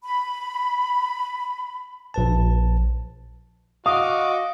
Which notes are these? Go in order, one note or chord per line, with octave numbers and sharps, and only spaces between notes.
B5
A#1 B4 A5
F#4 D#5 F5 D6 D#6